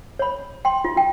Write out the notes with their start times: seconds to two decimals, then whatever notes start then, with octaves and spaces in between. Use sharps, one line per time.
0.19 C#5 B5
0.65 G5 C6
0.84 F4
0.96 F4 G5